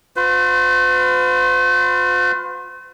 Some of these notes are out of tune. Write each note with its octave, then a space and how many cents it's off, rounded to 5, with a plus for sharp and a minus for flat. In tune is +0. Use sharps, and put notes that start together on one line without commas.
F4 +40 C5 -45